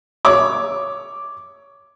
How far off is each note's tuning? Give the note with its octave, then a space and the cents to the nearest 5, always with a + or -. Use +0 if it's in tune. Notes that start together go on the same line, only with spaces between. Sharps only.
C#5 +15 D6 +0